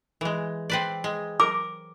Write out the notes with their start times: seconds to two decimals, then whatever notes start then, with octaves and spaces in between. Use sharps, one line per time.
0.21 E3 G#3
0.70 C4 B4 D5
1.04 G#3
1.40 A#4 D6